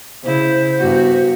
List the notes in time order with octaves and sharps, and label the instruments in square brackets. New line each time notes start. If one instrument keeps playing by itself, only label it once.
[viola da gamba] C#3 E4 [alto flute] C5
[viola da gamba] G2 B3 F#4